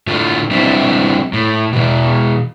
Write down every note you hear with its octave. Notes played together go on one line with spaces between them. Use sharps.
A2 D3 F4
G3 C4 D4 E4 F4 C5
A2
B2 E3